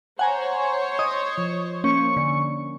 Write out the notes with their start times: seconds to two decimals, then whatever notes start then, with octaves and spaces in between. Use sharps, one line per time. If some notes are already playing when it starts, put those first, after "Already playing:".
0.19 C5 C#5 F#5 G#5 A#5
0.99 D#5 D#6
1.38 F3
1.84 A#3 C#4 C#6
2.17 D3 C#4